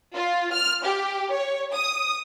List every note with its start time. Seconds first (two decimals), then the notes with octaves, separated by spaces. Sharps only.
0.14 F4
0.53 F6
0.84 G4
1.31 C#5
1.75 D#6